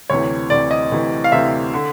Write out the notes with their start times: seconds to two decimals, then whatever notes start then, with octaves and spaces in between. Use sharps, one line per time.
0.10 D2 C3 E3 C#5
0.50 D2 C3 E3 D5
0.71 D#5
0.92 D2 C3 E3
1.24 F5
1.32 D2 C3 E3 E5
1.74 D3